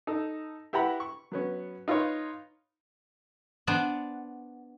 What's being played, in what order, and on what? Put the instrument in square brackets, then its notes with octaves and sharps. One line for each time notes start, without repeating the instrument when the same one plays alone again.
[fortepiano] D#4 A4
E4 G4 B4 F#5 A#5 B5
C#6
F#3 B3 C#4
D#4 F4 B4 C#5
[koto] B3 D4 C5 D5 F#5